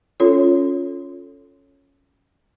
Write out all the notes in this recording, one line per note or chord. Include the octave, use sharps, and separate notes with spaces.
C#4 F4 A4 C#5